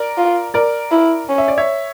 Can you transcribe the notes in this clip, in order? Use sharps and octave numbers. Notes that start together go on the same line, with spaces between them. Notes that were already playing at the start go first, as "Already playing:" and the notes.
Already playing: A#4 D5
F4
A#4 D5
E4
C#4
E5
D5
C#5 E5